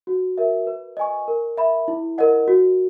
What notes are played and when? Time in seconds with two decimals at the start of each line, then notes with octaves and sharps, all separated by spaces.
0.07 F#4
0.38 A#4 E5
0.67 B4
0.97 D#5 G#5 C#6
1.28 A#4
1.58 E5 B5
1.88 E4
2.18 A#4 D#5 F#5
2.48 F#4